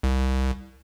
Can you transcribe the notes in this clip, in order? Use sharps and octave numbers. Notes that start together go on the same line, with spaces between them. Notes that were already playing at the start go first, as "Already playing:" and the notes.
C2